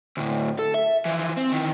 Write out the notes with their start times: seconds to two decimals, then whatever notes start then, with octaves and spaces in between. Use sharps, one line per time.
0.17 D2 A2
0.59 A4
0.74 E5
1.06 E3 F3
1.37 C4
1.52 D#3 E3